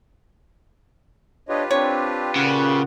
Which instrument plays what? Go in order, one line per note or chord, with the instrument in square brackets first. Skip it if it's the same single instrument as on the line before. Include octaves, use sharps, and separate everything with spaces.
[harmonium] D4 C#5 D#5 [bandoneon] F4 G4 B4
[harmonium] C4 D4 [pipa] C#5
[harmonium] A#2 F#5 [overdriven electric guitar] C#3